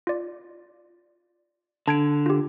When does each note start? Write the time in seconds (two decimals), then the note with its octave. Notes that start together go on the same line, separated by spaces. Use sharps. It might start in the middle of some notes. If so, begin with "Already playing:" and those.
0.07 F4 D5
1.88 D3 A5 G#6 D7
2.26 F4 G4